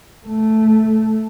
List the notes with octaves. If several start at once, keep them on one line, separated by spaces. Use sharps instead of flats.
A3